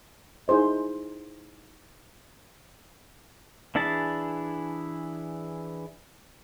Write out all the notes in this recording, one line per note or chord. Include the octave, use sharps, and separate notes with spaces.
D#4 E4 G#4 C5 D#5
E3 D4 E4 G#4 A5